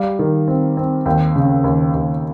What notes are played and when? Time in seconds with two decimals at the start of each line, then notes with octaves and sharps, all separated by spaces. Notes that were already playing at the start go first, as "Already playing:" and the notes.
Already playing: G3 F5
0.19 D#3
0.48 C4
0.77 C4
1.06 D#2 G5
1.36 C#3
1.64 D#2
1.94 D#2